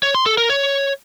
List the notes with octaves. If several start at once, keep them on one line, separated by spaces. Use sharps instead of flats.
C#5
C6
A4
A#4
C#5